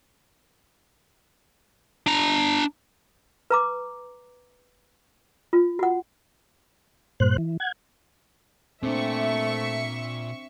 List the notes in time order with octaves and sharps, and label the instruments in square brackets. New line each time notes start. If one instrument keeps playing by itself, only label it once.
[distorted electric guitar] D4 A#5
[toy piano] B4 A#5 D6
F4
F#4 F#5
[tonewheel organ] G2 A#2 C5 F#6
E3
F#5 G#6
[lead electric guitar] A#2 [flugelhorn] A3 [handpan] C4 D4 [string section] E5 C#6